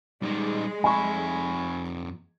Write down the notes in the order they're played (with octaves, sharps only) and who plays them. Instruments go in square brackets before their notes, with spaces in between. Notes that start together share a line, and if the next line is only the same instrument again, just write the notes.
[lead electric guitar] G3 D#4 [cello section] G#3
[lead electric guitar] F2 E5 [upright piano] G#5 B5 C#6